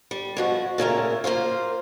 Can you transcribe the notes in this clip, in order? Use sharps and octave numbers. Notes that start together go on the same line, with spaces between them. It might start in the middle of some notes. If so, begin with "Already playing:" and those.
G3
B2 F3 F#4
A#2 C#3 A3 A#4
A#3 F4 C5 F5